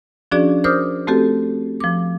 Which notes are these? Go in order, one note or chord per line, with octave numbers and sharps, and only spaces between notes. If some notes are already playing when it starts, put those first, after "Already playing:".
F3 C#4 D4 F#4 G#4 D5
A#4 C5 D6 D#6 F6 G6
A3 C4 F#4 G4 A4
F3 D6